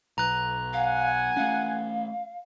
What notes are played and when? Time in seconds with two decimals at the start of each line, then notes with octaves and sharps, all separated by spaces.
0.18 B1 B4 A#5 F#6
0.73 F5 F#5 G#5
1.37 A3 C#4 F5